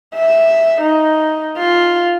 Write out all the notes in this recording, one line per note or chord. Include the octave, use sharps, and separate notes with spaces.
E5
D#4
F4